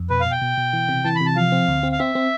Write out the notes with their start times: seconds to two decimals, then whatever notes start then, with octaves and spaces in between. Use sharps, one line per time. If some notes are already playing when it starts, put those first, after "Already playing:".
Already playing: F2
0.10 B2 B4
0.20 F5
0.26 B2
0.31 G5
0.42 B2
0.57 B2
0.73 E3
0.89 C3
1.05 E3 A5
1.15 C3 B5
1.26 A5
1.36 F3 F5
1.52 C4
1.68 D2
1.83 C4
1.92 F5
1.99 C4 E5
2.15 C4